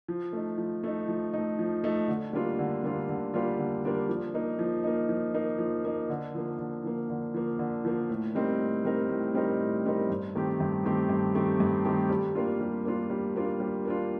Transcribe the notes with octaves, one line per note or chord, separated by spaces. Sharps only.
F3
A3 D#4
F3
A3 D#4
F3
A3 D#4
F3
A3 D#4
D3
G3 A#3 D4 F4
D3
G3 A#3 D4 F4
D3
G3 A#3 D4 F4
D3
G3 A#3 D4 F4
F3
A#3 D#4
F3
A#3 D#4
F3
A#3 D#4
F3
A#3 D#4
D3
F3 A#3
D3
F3 A#3
D3
F3 A#3
D3
F3 A#3
A2
G3 C4 D#4 A#4
A2
G3 C4 D#4 A#4
A2
G3 C4 D#4 A#4
A2
G3 C4 D#4 A#4
G2
D#3 A3 C4 G4
G2
D#3 A3 C4 G4
G2
D#3 A3 C4 G4
G2
D#3 A3 C4 G4
G3
A#3 D4 F4
G3
A#3 D4 F4
G3
A#3 D4 F4
G3
A#3 D4 F4